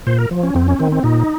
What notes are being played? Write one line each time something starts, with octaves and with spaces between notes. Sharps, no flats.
A#2 C5
A#4
F3
C#4
F2 C4
C#4
D#3 C4
C4
A#2 D#4